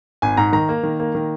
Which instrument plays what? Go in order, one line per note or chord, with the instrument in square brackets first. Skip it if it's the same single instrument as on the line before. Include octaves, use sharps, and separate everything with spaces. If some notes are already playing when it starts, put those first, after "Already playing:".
[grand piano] G#1 G#5
G#2 A#5
D#3 A#5
A#3
D#3
A#3
D#3